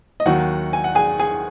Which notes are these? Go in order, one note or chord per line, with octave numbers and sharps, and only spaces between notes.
D#5
D#2 D#3 F#3 F#4 F#5
G#5
F#5
G#4 G#5
G#4 G#5